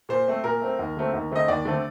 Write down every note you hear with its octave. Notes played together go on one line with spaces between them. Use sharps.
A#2 C5
A3 C4
A#2 A#4
A3 C4
D#2
D3 A3 C4
D#2
D3 A3 C4 D#5
D#2 D5
D3 A3 C4